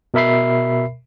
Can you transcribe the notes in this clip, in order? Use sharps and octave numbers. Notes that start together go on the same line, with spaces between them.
B2 A#4 E5 B5 C7